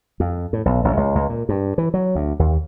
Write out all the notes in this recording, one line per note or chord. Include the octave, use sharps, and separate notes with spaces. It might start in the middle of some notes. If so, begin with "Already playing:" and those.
F2
A2
B1
A1
C#2
C#2
A#2
G2
E3
F#3
D2
D#2